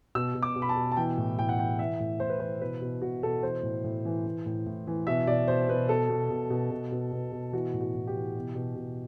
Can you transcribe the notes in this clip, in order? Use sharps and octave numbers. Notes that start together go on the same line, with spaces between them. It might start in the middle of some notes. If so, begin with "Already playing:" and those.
B2 E6
B2
D6
B2
B5
A5
B2
A5
E3 G5
A2
A2 G5
F#5
E3 G5
E3 E5
A2
A2 C5
B4
E3 C5
B2 B4
B2
B2 F#4
B2 A4
E3 C5
A2
A2
E3
E3
A2
A2
E3
B2 E5
B2 D5
B2 C5
B2 B4
B2 A4
B2
B2
B2
B2
B2
B2
B2
E3 F#4
A2
F#4
A2
G4
E3
B2
B2
B2